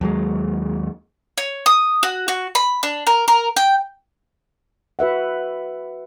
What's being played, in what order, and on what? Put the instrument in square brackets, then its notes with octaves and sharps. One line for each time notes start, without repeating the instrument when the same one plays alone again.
[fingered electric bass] D#2 F#3 G#3
[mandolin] C#5
D#6
F#4
F#4
B5
D4
A#4
A#4
G5
[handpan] F#4 B4 E5 F#5